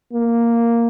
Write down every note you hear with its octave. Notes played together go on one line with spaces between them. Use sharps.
A#3